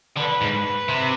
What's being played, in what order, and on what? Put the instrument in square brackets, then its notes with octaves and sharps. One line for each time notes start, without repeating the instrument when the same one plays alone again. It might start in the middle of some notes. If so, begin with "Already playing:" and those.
[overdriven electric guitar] D3 [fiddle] B4
[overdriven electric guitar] G#2
C3